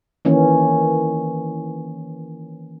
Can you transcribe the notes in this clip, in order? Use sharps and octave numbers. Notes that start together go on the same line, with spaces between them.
D#3 E3 A#3 C#4